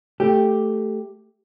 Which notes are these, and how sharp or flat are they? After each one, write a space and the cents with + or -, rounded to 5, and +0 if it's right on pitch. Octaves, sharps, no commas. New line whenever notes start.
A3 +0 G4 +0